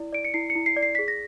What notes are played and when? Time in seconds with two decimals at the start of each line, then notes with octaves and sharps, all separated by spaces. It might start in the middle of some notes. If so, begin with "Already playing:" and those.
Already playing: E4 D5
0.13 D5 D7
0.25 C#7
0.34 E4 C7
0.50 C#7
0.55 E4
0.66 C7
0.77 D5
0.82 C7
0.95 G#4 B6
1.08 A#6